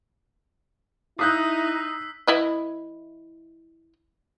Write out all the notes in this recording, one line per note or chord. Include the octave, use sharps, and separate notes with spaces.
D#4 E4 D#6 E6 F#6 G6 B6 C7
E3 E4 D#5